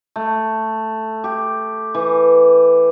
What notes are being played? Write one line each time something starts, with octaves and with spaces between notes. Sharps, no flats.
A3
G4
E3